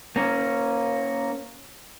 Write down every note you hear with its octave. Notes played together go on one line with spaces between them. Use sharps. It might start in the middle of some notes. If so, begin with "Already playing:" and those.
A#3 C#4